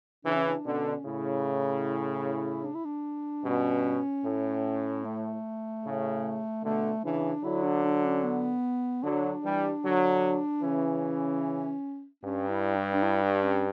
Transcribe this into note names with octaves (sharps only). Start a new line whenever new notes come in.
C#3 E3 D4
C#4
D4
B2 D3 C#4
A2 C#3 E4
D4
E4
D4
G2 B2 C#4
A2
A3
A2 C#3
B2 D3 A3
C#3 E3 D4
D3 F#3 E4
D4
D4
C#4
B3
D3 F#3 D4
E3 G3
D3 F#3
C#3 E3 C#4
G2 C#4
E4
D4
D4
E4
D4
C#4